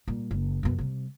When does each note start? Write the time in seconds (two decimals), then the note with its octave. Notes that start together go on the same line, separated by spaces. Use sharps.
0.08 A#2 G3
0.31 F#1
0.63 F#2 B2
0.79 C3 G3